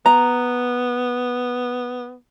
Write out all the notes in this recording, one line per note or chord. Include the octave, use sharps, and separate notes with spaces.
B3 A#5